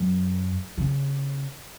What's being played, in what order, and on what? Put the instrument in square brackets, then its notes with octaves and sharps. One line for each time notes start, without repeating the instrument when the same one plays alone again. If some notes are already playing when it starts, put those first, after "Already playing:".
Already playing: [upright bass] F#2
C#3